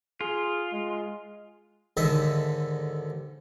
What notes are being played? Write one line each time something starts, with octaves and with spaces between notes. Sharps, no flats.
F4 G#4
G#3
D#2 G#2 D3 A4 D#5 E5